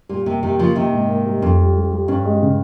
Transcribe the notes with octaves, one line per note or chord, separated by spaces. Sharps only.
A#2 G3
C3 A#3
C3 D#3 G3
C#3 F3 A#3
C3 D#3 A#3
G#2
A#3
G3
F2 C#4
G3
G3
G3
G2 C#4
G#3
C#3